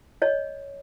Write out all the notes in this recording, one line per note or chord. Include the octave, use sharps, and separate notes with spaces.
C#5 D#5